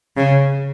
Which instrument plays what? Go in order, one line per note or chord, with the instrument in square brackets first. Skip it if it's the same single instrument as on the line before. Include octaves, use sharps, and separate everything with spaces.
[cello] C#3